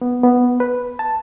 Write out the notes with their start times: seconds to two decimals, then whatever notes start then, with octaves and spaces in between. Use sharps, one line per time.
0.01 B3
0.23 B3
0.60 B4
0.99 A5